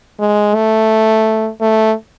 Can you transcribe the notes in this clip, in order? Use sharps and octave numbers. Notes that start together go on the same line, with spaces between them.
G#3
A3
A3